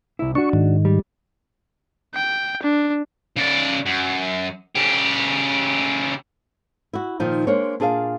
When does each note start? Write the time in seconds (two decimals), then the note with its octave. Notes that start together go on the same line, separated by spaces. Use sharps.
0.19 C2 E4
0.35 D4 F#4 C#6
0.53 G#2 D#3
0.85 G3
2.15 G5
2.63 D4
3.36 C#3 D5
3.86 F#2
4.75 C#3 G4
6.93 E4 F#4
7.20 A#2 D#3 F3 D#4
7.47 G#3 A#3 D4 C5 C#5
7.80 A#2 D4 G#4 D5 F5